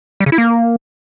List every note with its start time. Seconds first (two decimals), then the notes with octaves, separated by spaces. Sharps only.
0.20 G3
0.26 C#3
0.32 E4
0.38 A#3